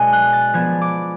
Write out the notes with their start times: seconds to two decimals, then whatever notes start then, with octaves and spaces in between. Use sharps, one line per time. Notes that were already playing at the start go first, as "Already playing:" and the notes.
Already playing: B2 G#3 D4 F#5 G#5
0.13 F#6
0.33 A6
0.54 F3 B3 D4 G#6
0.81 D6